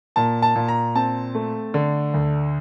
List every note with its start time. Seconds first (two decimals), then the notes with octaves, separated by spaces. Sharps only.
0.16 A#2 A5
0.42 A5
0.56 A#2
0.68 A#5
0.95 C4 A5
1.35 A3
1.74 D3
2.14 D2